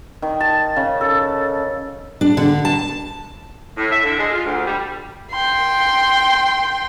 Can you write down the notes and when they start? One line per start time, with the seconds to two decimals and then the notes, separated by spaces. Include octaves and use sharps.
0.22 D#3
0.40 A5
0.76 C#3
1.01 A4
2.21 D4
2.37 D3
2.65 A5
3.77 A2
3.90 E5
4.03 D3
4.19 G#3
4.32 F4
4.45 D2
4.66 G3
5.32 G5 C6